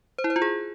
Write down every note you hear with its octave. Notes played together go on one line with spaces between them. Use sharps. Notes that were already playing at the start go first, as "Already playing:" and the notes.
C5
E4
C5
F4
G#4